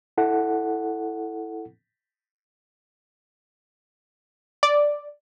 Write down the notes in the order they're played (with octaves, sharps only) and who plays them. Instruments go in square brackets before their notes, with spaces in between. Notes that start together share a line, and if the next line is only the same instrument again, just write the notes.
[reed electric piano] E4 A4 F#5
[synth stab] D5